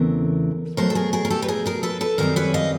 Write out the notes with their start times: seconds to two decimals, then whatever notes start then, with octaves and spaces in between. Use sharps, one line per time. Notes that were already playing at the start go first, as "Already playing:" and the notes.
Already playing: E2 C#3 E3 A3 C4 A#4
0.77 B2 F#3 A3 A#4 C5
0.90 A4
0.95 G#4 A#4
1.13 G#4 A#4
1.25 A#4
1.30 G4 A4
1.42 B4
1.48 G#4 A#4
1.66 G#4 A#4
1.83 A4 B4
2.01 A4 B4
2.18 F#2 D#3 G3 C4 A#4 C5
2.36 B4 C#5
2.54 D#5 F5